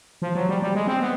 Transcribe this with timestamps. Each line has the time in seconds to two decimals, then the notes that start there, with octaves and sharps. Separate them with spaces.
0.22 F3
0.35 F#3
0.49 G3
0.62 G3
0.75 G#3
0.87 C4
1.02 B3